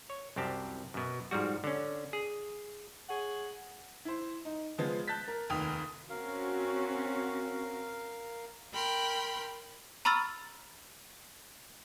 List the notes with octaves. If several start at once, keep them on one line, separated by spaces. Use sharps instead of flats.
C#5
C2 F#2 C4 G4 A5
F#2 B2
G#2 F3 G3 F#4
D3 C#4
G#4
G#4 C#5 F#5
E4 C5
D#4
C#3 F3 G#3 B3
A5 F#6 G6 A6 B6
A#4
F1 D#2 G5 D#6 F7
C4 C#4 F#4 A#4 F5
A#4 G5 B5 C6
A#5 B5 C#6 E6 F6 A6